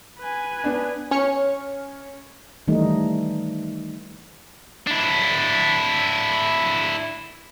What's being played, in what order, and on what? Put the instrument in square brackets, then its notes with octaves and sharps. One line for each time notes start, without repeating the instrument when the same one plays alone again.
[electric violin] B4 G#5
[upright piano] B3 D4
[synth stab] C#4 C#5 F6 C#7
[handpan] D#3 E3 G3 A3 D#4
[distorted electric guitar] D4 E4